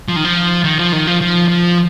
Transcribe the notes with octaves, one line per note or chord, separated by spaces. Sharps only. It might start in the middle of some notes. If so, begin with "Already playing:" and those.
F3
D#3
F3
D#3
F3
D#3
F3
F3
F3